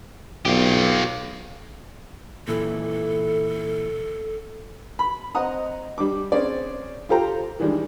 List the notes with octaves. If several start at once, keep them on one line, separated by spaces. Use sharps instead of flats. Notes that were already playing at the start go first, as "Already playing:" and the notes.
B1 F4 G4
A#2 E3 E4 A4
B5
C4 D#5 F#5 A#5 D#6
G3 D4 D6
C4 C#4 G#4 D5
F4 G4 A4 C5 G5 A#5
D#3 E3 G3 G#3 D4 D#4